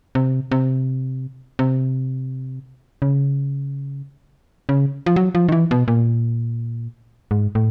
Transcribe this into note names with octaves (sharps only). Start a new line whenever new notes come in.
C3
C3
C3
C#3
C#3
F3
F#3
F3
D#3
E3
B2
A#2
G#2
A2